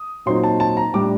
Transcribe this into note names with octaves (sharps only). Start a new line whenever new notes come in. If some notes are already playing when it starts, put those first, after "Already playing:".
Already playing: D#6
A#2 F#3 C4 D#4 C6
A5
A5
A#5
A2 G3 D4 D6